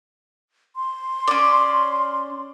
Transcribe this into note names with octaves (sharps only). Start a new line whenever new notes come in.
C6
C#4 D5